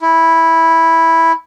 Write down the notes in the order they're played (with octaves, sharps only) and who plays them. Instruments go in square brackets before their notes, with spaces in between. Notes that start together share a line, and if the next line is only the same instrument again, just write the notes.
[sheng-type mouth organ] E4